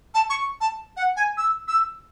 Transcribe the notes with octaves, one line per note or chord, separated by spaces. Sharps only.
A5
C#6
A5
F#5
G#5
E6
E6